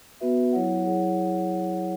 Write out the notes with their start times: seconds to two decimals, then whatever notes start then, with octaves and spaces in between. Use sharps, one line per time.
0.20 B3 F#4 B4 E5
0.52 F#3 E4 C#5 F#5
0.84 F#3 E4 G#4 C#5 F#5